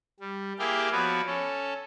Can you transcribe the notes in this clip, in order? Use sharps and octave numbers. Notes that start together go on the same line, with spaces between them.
G3
A#3 E4 G4 G#4 F5 G5
F3 B3 F#4 B4 C#5 D5
C#4 A4